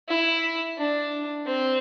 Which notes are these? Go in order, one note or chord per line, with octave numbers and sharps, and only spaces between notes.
E4
D4
C4